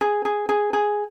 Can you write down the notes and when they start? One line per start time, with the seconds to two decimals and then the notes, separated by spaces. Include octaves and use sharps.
0.01 G#4
0.25 G#4
0.49 G#4
0.73 G#4